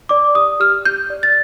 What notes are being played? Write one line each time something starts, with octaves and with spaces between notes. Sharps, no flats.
D5 D6
G4 D#6
G4 F6
G4 G6
D5
A6